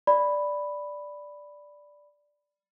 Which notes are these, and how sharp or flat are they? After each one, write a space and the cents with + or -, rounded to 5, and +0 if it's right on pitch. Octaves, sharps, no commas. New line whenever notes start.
D5 +0 B5 +0